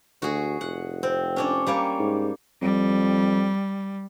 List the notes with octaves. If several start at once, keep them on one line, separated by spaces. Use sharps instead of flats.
D2 F#4 G#4
F1 F#5
C4
C#4 D4 C#5
G3 A#3 C#5
G#2
F2 G3